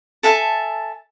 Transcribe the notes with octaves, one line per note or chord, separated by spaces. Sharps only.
A4 E5 G#5 A5